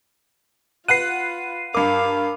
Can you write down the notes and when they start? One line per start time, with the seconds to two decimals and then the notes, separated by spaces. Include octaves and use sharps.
0.88 F4 B4 F#5 F#6 C7 D#7
1.75 G2 A#4 F5 B5 D6